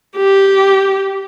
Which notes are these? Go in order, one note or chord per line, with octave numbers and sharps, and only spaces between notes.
G4